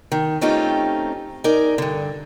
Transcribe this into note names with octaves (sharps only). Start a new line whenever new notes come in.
D#3
A3 C4 C#4 D#4 F4 G4
D#4 G#4 A#4 D5
G2 D3